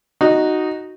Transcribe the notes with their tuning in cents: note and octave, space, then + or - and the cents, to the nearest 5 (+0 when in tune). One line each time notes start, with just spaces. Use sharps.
D#4 +0 F#4 +0